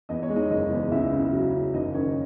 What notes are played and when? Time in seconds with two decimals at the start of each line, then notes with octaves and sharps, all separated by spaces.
0.09 E2 D#5
0.23 C#5
0.29 G#3
0.36 D#4 D#5
0.50 F#1 D#4 D#5
0.71 E2
0.91 C#2 E4 E5
1.13 C#3
1.33 F#3
1.53 C#3
1.74 F#1 D#4 D#5
1.94 D#3 C#4 C#5